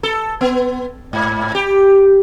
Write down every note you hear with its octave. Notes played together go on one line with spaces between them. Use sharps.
A4
B3
G#2
G4